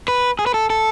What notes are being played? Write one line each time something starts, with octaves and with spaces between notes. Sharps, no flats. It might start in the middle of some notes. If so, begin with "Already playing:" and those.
B4
G#4
B4
A4
A4